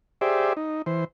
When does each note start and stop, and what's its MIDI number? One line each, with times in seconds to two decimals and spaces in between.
0.21 0.53 67
0.21 0.53 68
0.21 0.53 72
0.21 0.53 74
0.21 0.53 76
0.57 0.82 63
0.86 1.04 52
0.86 1.04 72